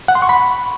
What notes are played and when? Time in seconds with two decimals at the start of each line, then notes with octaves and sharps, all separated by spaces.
0.08 F#5
0.15 C6
0.22 C#6
0.29 B5